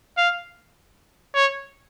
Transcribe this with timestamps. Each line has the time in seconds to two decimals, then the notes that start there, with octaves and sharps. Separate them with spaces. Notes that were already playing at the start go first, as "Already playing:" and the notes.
0.18 F5
1.35 C#5